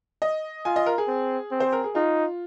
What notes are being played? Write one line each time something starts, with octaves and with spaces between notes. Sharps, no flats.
D#5
F4 G#5
D#5
A#4
G#4
C4
C4
C5
A#4
G#4
D#4 F4